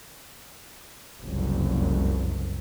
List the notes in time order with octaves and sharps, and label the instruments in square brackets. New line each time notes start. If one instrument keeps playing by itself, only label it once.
[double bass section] F#1 C2 F2